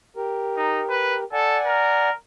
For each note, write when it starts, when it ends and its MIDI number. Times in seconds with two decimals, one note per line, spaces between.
0.16 1.24 67
0.16 1.24 70
0.57 0.82 63
0.89 1.15 71
1.33 1.57 69
1.33 2.09 74
1.33 2.09 78
1.33 2.09 80
1.65 2.13 70